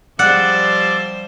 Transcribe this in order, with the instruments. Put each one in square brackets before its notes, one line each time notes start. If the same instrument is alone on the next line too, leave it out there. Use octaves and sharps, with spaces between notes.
[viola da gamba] F3 G3 C5 [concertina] D5 E6 [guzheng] F#5